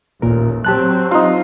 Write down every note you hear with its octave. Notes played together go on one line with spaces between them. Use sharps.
A1 D#2 A#2 A#4
F#3 C4 G4 A5 F#6
D#4 F4